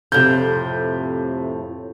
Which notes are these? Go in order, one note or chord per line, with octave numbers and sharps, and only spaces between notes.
F2 A2 C3 G6